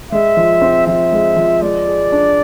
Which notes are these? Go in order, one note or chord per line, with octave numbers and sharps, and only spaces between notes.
G#3 E5
F3
C4
F3 E5
G#3
F3
G#3 D5
G#4
D4